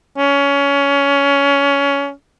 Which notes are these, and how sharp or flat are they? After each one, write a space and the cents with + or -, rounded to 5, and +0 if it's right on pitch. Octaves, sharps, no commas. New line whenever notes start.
C#4 +20